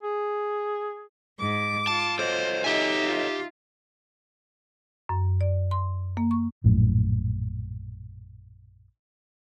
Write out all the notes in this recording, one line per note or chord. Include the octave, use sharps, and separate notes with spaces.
G#4
G#2 D6
F4 A5
A4 C5 C#5 D#5
D#4 G4 E5 G#5
F4
F#2
D5
C6
A#3
C#6
A#1 F#2 A2